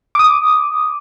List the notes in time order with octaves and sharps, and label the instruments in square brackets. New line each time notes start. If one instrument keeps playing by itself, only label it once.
[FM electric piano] D6 D#6